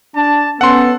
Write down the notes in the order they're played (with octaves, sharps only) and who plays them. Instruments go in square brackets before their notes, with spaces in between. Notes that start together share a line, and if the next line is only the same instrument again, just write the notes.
[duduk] D4 [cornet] A5
[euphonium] B3 [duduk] C#4 [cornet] A4 [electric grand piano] F#5 C6